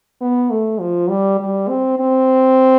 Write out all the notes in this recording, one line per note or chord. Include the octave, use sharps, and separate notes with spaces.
B3
A3
F3
G3
G3
C4
C4